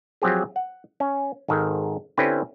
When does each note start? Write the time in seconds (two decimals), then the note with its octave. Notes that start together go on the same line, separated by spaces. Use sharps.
0.22 F3 F#3 C4 G4 G#4
0.56 F#5
1.00 C#4
1.48 G#1 G#2 D#3 A4
2.18 D3 C4 C#4 E4 G4 B4